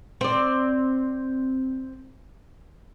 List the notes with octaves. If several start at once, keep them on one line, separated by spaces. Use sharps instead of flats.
C4 D5